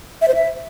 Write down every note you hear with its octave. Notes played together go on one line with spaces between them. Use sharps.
E5
C5
E5